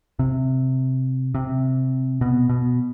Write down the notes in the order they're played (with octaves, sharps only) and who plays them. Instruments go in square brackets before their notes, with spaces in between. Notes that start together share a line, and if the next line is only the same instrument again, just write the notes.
[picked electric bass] C3
C3
B2
B2